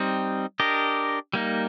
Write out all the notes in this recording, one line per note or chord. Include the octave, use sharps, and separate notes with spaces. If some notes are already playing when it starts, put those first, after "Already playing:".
Already playing: G3 C4 D#4
D4 G4 A#4 D#5
G3 A#3 D#4